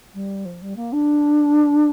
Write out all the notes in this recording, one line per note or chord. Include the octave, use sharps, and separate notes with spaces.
G3
F3
G3
A#3
D4